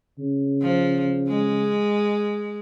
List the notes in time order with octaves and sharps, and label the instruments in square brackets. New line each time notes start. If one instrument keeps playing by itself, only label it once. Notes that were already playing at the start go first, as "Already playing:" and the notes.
[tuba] C#3
[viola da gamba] F3
G#3